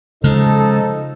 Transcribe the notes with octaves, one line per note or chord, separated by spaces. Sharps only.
C#3 F3 G#3 D#4 A4